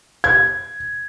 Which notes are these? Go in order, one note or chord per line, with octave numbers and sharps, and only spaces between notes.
G#6